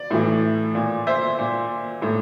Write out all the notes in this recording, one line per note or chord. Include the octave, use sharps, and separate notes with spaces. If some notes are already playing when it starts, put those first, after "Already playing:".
Already playing: D5
A2 E3
A#2
C5 E5
A#2
A2